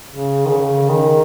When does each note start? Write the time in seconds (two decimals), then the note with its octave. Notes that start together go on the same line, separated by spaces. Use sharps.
0.10 C#3
0.45 D#3
0.49 C#3
0.89 D#3